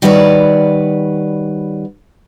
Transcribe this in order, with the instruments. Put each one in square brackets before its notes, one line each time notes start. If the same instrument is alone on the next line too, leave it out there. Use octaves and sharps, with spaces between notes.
[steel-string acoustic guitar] D#3 G3 F#4 B4 C#5 D5